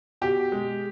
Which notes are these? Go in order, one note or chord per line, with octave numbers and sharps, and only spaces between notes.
B2 G4
G#3